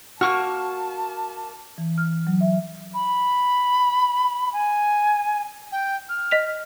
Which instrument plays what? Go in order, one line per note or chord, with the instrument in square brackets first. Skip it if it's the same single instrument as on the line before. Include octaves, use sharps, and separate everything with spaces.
[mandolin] A#3 C#6 F6 [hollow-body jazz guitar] F#4 [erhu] A5
[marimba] E3
F6
F#3
E5
[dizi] B5
G#5
G5
F6
[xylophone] D#5 B6 F7